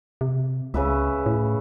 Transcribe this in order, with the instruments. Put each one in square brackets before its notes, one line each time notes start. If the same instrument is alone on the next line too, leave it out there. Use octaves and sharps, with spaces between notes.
[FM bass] C3
[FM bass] C#2 [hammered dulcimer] C#3 B4 E5
[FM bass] A2